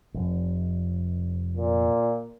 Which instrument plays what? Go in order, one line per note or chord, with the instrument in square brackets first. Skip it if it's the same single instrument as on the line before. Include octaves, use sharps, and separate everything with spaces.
[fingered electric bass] F1
[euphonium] A#2